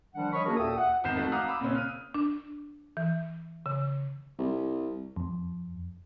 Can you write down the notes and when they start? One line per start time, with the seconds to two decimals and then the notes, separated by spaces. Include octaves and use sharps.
0.15 D#3 F3 G3 D4 F#5
0.33 C#5 D#5 B5 C#6
0.45 A#3 C#4 D4 F#4 G#4 A#4
0.57 D#2 A#2 A4 E5 G5 D#6
0.77 F#5
1.04 G#1 C3 B3 G6 C7 E7
1.15 F2 A3 F#4
1.32 F5 F#5 A#5 D6 D#6 F#6
1.48 B5 D6 E6
1.61 A#2 C#3 C4 C#4
1.75 F6 D#7
2.14 D4
2.97 E3
3.66 C#3
4.38 C2
5.16 F2